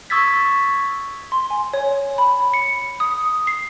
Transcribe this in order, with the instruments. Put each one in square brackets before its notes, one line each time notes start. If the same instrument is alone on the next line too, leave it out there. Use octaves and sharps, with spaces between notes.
[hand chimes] C#6 D#6 E6 G#6 A6 B6
[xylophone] C6
G#5
C#5
B5
C#7
D#6
C7